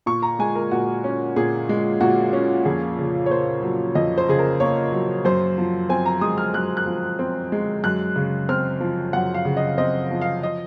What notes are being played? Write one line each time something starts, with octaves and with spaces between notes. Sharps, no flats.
A#2 C#6
A#5
G#3 G#5
A#4
A#2 F#4
C#4
A#2 G#4
G#3
A#2 F#4
C#4
F2 G#4
C#3
C#5
A#3 C5
F#3
F2 D#5
C5
C#3 G#4
A#4
A#3 C#5
F#3
F#2 C5
F3
C4 G#5
A#5
G#3 D#6
F6
F#2 F#6
F#6
F3
C4
G#3
F#2 F#6
C#3
C4 F6
F3
F#2 F#5
F5
C#3
D#5
C4 D#5
F3
F5
D#5